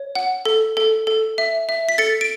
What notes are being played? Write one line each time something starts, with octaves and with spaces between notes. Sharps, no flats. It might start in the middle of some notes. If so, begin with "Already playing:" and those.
Already playing: C#5
F#5
A4
A4
A4
E5
E5
B6
A4 A6 C#7
D7